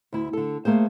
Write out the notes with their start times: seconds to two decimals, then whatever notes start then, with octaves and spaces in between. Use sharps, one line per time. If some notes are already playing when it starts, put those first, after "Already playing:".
0.13 D2 E4
0.33 D3 A4
0.65 A3 A#3 G#4 C5